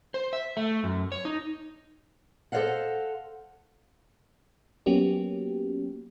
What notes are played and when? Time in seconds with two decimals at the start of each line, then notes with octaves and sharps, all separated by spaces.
0.14 C5
0.33 E5
0.57 A3
0.84 F#2
1.12 C#5
1.25 D#4
2.52 A4 C5 C#5 D#5 F5 F#5
4.86 F#3 A#3 B3 C#4 F#4 G4